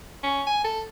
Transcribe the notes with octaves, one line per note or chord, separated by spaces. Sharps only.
C#4
G#5
A4